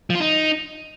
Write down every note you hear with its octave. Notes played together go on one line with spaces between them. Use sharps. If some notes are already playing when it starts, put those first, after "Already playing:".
F3
F4
D#4